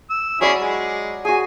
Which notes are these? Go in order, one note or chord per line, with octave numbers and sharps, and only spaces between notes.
E6
F#3 C#4 E4 G#4 D5 B5
G#3
F#4 G#4 G#5